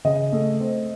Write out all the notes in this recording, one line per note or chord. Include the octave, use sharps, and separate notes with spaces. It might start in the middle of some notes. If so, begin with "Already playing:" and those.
C#3 D#5
A3
C4